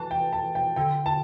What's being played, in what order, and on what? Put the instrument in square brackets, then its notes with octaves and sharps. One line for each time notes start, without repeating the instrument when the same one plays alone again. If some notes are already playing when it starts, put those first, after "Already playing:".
Already playing: [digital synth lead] E3 [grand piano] A5
[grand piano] G5
A5
G5
[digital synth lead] D3 [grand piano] G5
[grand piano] A5